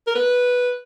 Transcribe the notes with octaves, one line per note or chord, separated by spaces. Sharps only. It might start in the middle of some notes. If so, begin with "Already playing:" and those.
A#4
B4